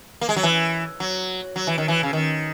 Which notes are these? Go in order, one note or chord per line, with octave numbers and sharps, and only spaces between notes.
A#3
G#3
F#3
E3
F#3
F#3
E3
D#3
E3
C#3
D#3